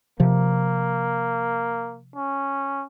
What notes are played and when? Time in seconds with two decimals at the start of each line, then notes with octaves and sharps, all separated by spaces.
0.20 C3 F3 A#3
2.16 C#4